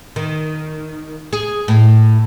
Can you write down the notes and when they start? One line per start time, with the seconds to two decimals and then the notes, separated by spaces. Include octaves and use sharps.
0.16 D#3
1.33 G#4
1.68 A2